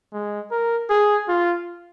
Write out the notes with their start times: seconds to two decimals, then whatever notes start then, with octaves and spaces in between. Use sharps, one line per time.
0.13 G#3
0.51 A#4
0.90 G#4
1.28 F4